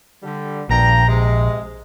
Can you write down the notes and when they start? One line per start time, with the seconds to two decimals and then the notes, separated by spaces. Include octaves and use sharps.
0.23 D3 G3
0.69 A#1 G2 G5 A#5
1.07 C3 G#3